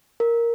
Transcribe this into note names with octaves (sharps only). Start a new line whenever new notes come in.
A#4